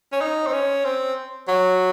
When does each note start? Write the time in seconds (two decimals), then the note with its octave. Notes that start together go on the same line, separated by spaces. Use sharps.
0.12 C#4
0.21 D#4
0.47 C4
0.53 C#4
0.85 C4
1.48 F#3